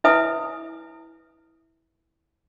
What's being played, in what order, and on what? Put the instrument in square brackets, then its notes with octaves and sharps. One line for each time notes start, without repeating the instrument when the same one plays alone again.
[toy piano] E4 B4 E5 G#5 D#6